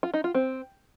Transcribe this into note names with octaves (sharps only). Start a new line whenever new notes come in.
F4
D#4
F4
C4